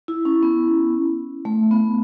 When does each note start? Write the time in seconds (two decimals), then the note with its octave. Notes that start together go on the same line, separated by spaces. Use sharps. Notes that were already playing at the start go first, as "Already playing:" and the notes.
0.08 E4
0.25 C#4
0.43 B3
1.45 A3
1.71 B3